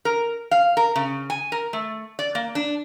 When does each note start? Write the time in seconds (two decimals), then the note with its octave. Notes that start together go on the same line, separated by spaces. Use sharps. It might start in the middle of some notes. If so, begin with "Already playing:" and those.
0.05 A#4
0.51 F5
0.77 A#4
0.96 C#3
1.30 G#5
1.52 A#4
1.73 A3
2.19 D5
2.35 A#3
2.55 D4